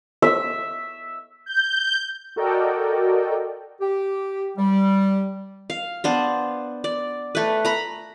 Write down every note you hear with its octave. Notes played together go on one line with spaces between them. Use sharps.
E5
G6
F#4 A4 A#4 D5 D#5 G5
G4
G3
F5
B3 D4 C5
D5
A3 B4
A#5 B5